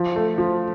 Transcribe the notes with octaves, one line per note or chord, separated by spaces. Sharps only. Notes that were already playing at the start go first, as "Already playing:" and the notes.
Already playing: F3
A3
F3